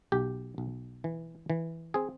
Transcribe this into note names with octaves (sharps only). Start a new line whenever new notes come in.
B1 G4
B1
E3
E3
C4 G#4